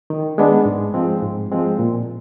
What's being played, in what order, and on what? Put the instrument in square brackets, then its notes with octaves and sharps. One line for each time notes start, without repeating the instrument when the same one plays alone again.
[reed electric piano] D#3
G#3 B3 D4
G#2
F3 G#3 C4
G#2
F3 G#3 C4
A#2